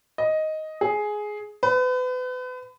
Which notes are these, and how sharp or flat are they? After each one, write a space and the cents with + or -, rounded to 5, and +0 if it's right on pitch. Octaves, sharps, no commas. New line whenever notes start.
D#5 +5
G#4 +10
B4 +35